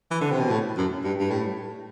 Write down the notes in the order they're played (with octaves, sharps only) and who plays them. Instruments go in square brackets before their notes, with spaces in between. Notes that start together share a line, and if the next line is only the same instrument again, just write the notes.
[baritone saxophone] E3
D3
C3
B2
A2
F#2
G2
G2
A2